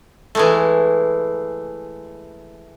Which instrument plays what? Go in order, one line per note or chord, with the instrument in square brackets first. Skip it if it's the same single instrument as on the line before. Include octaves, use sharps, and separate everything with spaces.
[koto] E3 G#3 A3